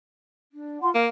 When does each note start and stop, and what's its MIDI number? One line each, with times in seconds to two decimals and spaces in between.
0.52 0.80 62
0.82 0.90 65
0.82 0.90 78
0.82 0.90 84
0.94 1.08 58
0.94 1.06 77
0.94 1.06 89